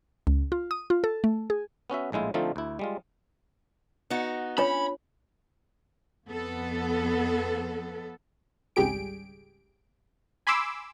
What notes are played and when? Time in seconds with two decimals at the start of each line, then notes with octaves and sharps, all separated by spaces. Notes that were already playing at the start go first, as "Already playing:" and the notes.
0.27 C#2
0.52 F4
0.71 D#6
0.90 F4
1.04 A4
1.24 A3
1.50 G#4
1.90 B3 C#4 F#4 E5
2.12 A#1 A2 G#3 E4 F4
2.34 D3 F3 A3 C4 D#4 F4
2.56 D2 E4
2.79 G3 G#3 F4
4.10 B3 D#4 F#4
4.58 C#4 D4 F4 C#5 B5
6.28 F2 B3 A4
8.76 G#1 C#2 G3 G4 G#4 D7
10.47 G#5 B5 C6 D6 E6